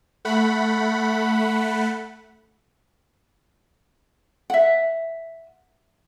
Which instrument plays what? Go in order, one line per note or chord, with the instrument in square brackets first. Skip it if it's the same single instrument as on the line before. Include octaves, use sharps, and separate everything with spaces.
[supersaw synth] A3 F#5 B5
[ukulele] E5 F#5